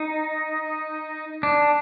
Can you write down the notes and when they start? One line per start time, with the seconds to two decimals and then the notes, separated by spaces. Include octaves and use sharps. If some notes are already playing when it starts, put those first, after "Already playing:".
Already playing: D#4
1.43 D4